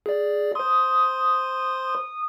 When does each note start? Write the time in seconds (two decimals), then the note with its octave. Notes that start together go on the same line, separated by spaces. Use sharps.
0.06 G#4 D5
0.55 C5 C6 D#6